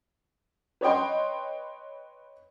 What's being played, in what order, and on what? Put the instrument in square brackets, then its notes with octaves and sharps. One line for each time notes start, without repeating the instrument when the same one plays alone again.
[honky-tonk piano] B4 C#5 D#5 G5 C6